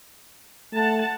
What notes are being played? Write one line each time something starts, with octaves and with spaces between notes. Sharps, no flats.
A3 F#5 A5